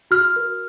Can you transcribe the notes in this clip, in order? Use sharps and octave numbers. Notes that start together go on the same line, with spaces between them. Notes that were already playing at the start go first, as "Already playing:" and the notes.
F#4 F6
A#4